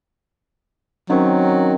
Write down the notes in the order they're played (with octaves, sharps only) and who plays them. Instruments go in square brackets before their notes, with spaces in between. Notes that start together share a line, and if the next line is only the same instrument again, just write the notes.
[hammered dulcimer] D#3 C4 C#4 [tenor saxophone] F#3